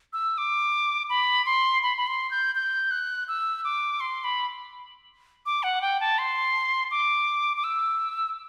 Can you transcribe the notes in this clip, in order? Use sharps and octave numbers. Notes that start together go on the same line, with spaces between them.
E6
D6
B5
C6
B5
B5
C6
G6
G6
F#6
E6
D6
C6
B5
D6
F#5
G5
A5
C6
D6
D6
E6